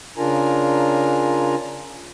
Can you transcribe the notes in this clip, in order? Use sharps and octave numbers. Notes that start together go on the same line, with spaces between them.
C#3 D4 F4 A#4 G#5 A#5